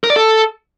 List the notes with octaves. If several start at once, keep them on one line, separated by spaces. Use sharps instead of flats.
A#4
D5
A4